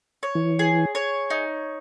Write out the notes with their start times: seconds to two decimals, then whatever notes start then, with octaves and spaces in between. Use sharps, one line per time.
0.23 C#5
0.35 E3
0.59 G#4
0.95 C#5
1.30 D#4